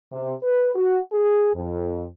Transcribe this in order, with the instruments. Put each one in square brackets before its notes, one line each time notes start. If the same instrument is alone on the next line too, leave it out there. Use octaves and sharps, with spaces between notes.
[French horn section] C3
B4
F#4
G#4
F2